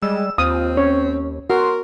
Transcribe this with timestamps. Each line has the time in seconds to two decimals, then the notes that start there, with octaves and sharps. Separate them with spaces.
0.02 G3 G#3 E6
0.38 D#2 C4 F4 D#6
0.77 C#4 C#5
1.50 F#4 A#4 C6